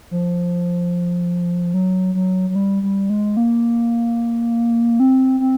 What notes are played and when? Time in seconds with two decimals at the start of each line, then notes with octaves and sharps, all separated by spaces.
0.11 F3
1.74 F#3
2.15 F#3
2.50 F#3
2.55 G3
2.83 G3
3.10 G#3
3.37 A#3
5.00 C4
5.40 C4